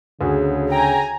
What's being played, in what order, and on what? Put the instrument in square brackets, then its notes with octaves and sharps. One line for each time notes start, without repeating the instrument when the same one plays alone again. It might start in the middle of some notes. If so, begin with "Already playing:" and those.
[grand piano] D2 F#4 [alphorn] C#3 [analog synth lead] G#4
[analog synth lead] G5 [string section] G#5 A#5